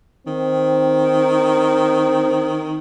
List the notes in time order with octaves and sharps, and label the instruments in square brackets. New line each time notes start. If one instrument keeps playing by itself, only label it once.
[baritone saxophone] D#3 [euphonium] C4